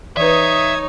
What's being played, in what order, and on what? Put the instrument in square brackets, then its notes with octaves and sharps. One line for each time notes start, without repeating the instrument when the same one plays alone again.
[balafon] E3 B4 [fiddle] D#4 C#5 [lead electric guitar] E5 [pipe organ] D#6 G#6